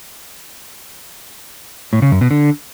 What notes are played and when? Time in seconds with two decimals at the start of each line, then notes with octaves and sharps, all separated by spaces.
1.93 A2
2.02 C#3
2.12 F#2
2.21 B2
2.31 D3